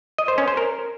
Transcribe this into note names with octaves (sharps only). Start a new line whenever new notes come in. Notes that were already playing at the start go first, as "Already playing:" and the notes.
D#5
C5
C#4
C5
A#4